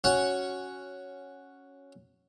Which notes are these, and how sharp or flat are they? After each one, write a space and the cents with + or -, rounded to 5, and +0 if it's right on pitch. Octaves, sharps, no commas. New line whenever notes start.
C#4 +0 F#4 +0 C#6 +0